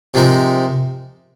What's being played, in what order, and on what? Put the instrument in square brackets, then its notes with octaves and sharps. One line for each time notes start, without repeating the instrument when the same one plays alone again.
[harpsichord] C3 F3 G#3 D#4 A#4